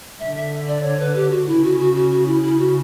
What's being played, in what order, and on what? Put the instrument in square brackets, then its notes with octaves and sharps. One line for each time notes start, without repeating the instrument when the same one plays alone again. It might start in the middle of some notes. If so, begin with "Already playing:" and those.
[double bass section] D3 [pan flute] E5
[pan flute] E5
D5
C#5
B4
G4
F#4
[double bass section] C#3 [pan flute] E4
[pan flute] F#4
F#4
F#4
F#4
E4
E4
F#4